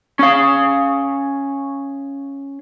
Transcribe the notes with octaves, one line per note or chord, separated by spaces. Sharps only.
C#4 F5